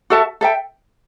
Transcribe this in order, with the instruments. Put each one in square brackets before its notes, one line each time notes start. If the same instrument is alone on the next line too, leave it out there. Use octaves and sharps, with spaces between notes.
[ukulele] F#4 A4 E5 A5
A4 E5 G5